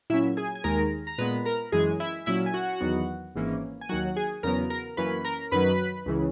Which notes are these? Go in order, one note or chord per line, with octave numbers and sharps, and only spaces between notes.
A#2 F#3 C#4 E4 E5
G#4 G#5
G#5
D#2 D#3 G#3 A#4 A#5
A#5
A#2 G#3 B3 B4 B5
A#4 A#5
F#2 E3 G#3 G#4 G#5
E4 E5
A#2 F#3 C#4 E4 E5
G#5
F#4 F#5
E2 D#3 F#3 B3
G#1 G#2 E3 A#3 C#4
G#5
D#2 D#3 F#3 F#4 F#5
G#4 G#5
E2 C#3 F#3 B3 A#4 A#5
A#4 A#5
F#2 E3 A#3 C#4 B4 B5
A#4 A#5
F#2 D#3 F#3 B4 B5
C#2 C#3 E3